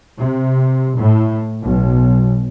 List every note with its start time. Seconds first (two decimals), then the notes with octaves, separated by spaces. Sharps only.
0.18 C3
0.96 A2
1.61 B1